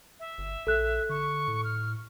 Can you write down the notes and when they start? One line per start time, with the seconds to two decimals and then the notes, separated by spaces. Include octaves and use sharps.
0.20 E5
0.38 G1
0.67 A#1 A4 F#6
1.10 D3 C#6
1.48 A2
1.64 F6